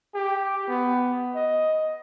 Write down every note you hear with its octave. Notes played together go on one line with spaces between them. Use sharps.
G4
B3
D#5